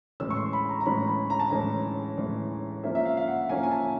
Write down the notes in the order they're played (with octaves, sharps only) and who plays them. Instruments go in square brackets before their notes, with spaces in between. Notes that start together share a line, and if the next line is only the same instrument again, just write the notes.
[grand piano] A2 E3 G#3 C#4 E6
C#6
C6
B5
A#5
A#5
A2 E3 G#3 C#4 B5
B5
A#5
A5
A2 E3 G#3 C#4 A#5
A2 E3 G#3 C#4
F3 A#3 C#4 E5
E5
F5
F5
F#5
F3 A#3 C#4 G#5
G#5
A5